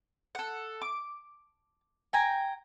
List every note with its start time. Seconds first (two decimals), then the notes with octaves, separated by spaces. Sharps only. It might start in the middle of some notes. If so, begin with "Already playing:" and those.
0.35 A4 F#5
0.82 D6
2.13 G5 G#5 A#5